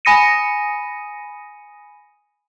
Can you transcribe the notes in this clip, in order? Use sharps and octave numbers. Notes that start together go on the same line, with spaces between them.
G#5 B5 D#6 A#6 C#7 D#7